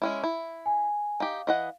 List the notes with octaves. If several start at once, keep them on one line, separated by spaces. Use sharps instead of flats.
G#3 C#4 E4
E4
G#5
D#4 G4 F5
E3 D#5 F#5